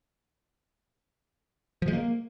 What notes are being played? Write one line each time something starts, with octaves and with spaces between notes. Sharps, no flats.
F3
G#3
A#3